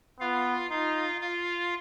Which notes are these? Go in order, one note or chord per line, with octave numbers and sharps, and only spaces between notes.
B3 F4 F5
D#4 F4 F5
F4 F5